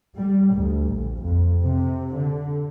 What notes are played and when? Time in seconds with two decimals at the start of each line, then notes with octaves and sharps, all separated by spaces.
0.16 G3
0.52 D2
0.91 A#1
1.22 F2
1.61 C3
2.14 D3